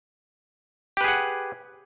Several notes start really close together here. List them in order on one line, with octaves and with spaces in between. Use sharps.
G4 B4 G#4 F#5